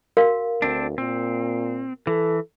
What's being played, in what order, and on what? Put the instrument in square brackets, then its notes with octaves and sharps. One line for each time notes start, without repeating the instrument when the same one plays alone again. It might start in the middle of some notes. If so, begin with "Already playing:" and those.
[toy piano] F#4 A#4 F5
[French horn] D2 [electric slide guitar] C4 D4
[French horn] A#2 [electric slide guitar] C4
[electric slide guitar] E3 [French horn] A4